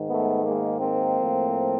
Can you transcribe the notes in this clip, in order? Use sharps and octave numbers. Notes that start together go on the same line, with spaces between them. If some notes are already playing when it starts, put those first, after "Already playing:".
Already playing: G#2 D#3
A3 B3
G#3 A#3
A#3 C4
A2 F3